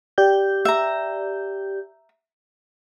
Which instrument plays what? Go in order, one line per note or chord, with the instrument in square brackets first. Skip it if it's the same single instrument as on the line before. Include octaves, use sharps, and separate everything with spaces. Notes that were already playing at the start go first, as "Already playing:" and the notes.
[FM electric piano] G4 D5 G6
[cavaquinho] E5 A#5